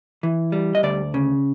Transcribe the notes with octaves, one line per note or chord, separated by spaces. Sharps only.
E3
G3
D#5
D2 D5
C#3